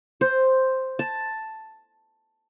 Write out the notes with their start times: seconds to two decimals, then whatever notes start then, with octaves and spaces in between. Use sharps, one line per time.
0.21 C5
0.99 A5